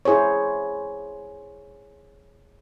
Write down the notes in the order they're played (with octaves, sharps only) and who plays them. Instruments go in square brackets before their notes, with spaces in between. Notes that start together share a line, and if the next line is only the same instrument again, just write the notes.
[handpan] E4 G#4 C5 C#5